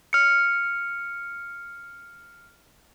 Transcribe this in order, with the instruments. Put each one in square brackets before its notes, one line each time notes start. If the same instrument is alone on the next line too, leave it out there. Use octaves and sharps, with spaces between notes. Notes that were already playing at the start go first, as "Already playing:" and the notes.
[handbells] F6 C#7